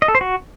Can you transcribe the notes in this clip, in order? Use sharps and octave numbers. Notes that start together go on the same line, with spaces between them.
D#5
A4
C5
F#4